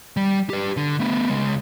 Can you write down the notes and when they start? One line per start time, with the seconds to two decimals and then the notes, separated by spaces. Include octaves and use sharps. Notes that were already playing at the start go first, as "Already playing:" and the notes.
0.17 G3
0.50 G4 B4
0.77 D3
1.00 A3 B3
1.30 C#2 G#3